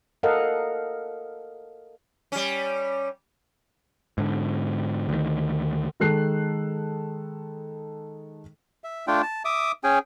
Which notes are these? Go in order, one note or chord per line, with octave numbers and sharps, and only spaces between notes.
A4 A#4 D#5 F5 F#5
G3 C#4
G#2 D3
D2 D#3
D#3 G#3 A4 F#6 C7
E5
A3 D4 F4 G5
A5
E5 D6 D#6
C#4 G#4 G5 G#5